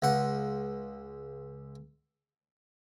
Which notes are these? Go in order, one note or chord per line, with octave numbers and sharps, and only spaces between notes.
C#2 F#5